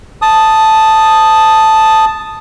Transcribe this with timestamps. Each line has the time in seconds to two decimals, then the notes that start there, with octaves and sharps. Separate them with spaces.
0.22 A5 D#6